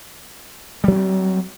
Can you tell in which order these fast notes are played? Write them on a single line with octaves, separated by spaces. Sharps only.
G3 F#3 C#4 C4